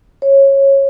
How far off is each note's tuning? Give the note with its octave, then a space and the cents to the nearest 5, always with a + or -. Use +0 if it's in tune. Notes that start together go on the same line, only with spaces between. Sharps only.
C#5 -15